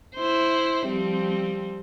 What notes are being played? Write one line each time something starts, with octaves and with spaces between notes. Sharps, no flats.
E4 C5
F3 G3 C4